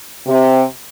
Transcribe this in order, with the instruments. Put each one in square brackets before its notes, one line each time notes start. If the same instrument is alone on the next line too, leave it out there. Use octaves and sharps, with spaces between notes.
[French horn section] C3